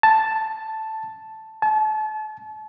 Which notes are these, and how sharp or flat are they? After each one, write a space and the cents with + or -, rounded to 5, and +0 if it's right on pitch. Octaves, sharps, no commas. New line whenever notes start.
A5 +0
A5 -35